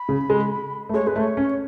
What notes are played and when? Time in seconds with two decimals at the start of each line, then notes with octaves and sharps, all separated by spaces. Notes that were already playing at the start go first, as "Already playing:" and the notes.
Already playing: B5
0.09 C#3
0.30 G#3
0.89 A3
0.94 G#3 C#5
1.07 G#3 B4
1.16 A3
1.20 C#5
1.37 C#4